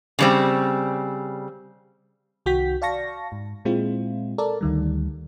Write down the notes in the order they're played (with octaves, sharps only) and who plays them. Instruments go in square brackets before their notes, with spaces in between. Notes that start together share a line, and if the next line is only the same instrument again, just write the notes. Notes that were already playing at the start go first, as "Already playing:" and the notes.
[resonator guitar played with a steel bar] C#3 G3 C4
[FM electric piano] C2 D#3 F#4 G5 G6 B6
D5 F5 A5 C#6 A#6
G#2
A#2 G#3 C4 E4 F4
A4 A#4 D5 A5
D2 D#3 G3